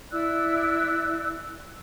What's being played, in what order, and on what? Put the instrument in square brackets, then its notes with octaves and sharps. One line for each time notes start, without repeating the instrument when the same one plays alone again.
[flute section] E4 D5 E6 F#6